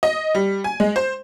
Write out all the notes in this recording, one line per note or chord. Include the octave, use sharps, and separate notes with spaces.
D#5
G3
G#5
G#3
C5